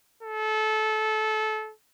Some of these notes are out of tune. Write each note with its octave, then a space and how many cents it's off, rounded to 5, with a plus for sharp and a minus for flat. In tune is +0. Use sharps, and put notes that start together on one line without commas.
A4 -25